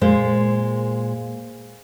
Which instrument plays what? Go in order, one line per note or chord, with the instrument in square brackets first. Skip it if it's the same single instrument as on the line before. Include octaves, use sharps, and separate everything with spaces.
[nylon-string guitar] A#2 G#3 C5